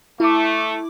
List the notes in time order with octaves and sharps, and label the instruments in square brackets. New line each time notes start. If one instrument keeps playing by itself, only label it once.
[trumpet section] A3 [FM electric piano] E4 D6